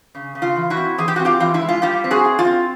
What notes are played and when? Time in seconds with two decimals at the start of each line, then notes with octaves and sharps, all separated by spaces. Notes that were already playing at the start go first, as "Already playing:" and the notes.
0.15 C#3
0.35 C#3
0.42 F4
0.56 E3
0.70 E4 F#4
0.77 C4
0.98 E3 G#4
1.08 G4
1.16 F#4
1.20 C4
1.25 F4 G4
1.40 E3 F4
1.54 E4
1.61 G#3
1.69 F4
1.82 G3 F4 G4
2.04 C4
2.11 F#4 G#4
2.25 E4
2.39 F4
2.45 C4